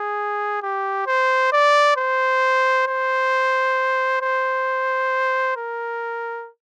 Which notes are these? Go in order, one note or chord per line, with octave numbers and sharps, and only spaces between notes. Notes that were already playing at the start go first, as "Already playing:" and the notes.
Already playing: G#4
G4
C5
D5
C5
C5
C5
A#4